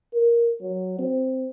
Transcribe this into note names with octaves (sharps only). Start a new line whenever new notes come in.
A#4
F#3
C4